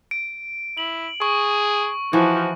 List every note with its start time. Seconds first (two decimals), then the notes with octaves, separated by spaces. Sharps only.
0.11 D7
0.77 E4 F#7
1.22 G#4 C#6
2.13 E3 F3 F#4